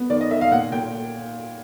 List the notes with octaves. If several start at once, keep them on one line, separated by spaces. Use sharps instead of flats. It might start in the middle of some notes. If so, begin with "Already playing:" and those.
Already playing: B3
D#3 D5
D#5
D#3 E5
F5
A#2 F#5
A#2 G5